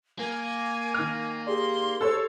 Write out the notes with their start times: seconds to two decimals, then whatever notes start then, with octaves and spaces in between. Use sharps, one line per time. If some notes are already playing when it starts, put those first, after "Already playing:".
0.19 A#3 G#5
0.94 D#3 F6
1.46 G4 G#4 D5 C6
2.01 A4 C5 C#5 E6